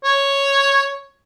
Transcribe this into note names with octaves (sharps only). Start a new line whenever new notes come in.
C#5